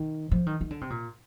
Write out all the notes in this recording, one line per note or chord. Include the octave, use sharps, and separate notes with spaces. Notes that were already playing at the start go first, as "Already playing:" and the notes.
Already playing: D#3
F3
D#3
D#3
D3
C3
A#2